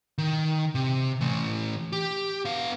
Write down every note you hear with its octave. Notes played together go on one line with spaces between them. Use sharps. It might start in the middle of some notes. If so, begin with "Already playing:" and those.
D#3
C3
E3 A3
G4
B3 F5